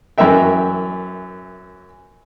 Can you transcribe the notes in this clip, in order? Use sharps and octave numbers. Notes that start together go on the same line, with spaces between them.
F#2 E3 A#4 E5 G5